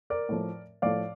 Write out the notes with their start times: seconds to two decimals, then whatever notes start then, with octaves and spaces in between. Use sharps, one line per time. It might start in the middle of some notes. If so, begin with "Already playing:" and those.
0.10 A#4 D5
0.29 A2 F3
0.82 A2 F3 D5 F5